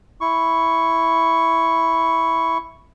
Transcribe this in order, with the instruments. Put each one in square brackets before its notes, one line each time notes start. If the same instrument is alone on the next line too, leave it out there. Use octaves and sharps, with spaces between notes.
[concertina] E4 C#6